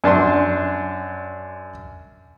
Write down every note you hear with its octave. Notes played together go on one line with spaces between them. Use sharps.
F#2 D4 A5 C6